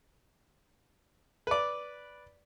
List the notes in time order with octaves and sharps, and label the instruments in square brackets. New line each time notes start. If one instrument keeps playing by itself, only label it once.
[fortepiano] B4 D5